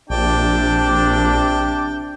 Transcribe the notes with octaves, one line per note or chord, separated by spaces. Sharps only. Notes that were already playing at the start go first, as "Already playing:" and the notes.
A#1 C3 D4 G5 A5 D6